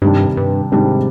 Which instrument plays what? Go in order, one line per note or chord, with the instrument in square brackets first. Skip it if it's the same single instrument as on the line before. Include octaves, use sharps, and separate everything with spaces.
[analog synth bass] G2 [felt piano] C3 D#3 G3 D4
[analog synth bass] G2
[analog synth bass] G#2 [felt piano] C3 D#3 G3 D4